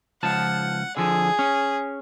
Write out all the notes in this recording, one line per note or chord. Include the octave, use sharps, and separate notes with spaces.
C#2 F3 F#5 A5
D3 F3 G#4
C#4